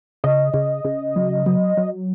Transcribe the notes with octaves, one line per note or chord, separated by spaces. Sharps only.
C#3 D#5
C#3
C#3
F#3
F#3
F#3